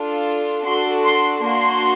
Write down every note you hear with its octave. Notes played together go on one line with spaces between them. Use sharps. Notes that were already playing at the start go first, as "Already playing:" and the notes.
Already playing: D4 F4 A4
D4 F#4 A4 C6
C6
A#3 D4 F#4 C6